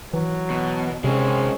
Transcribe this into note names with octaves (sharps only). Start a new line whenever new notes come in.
E3 F#3
B2
C3 G#3 C4 C#4